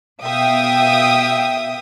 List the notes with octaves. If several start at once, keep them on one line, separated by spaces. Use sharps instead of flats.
B2 E5 F5 G5 D#6